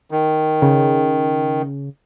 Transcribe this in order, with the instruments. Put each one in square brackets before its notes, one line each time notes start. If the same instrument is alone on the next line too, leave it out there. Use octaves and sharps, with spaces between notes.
[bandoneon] D#3
[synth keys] C#3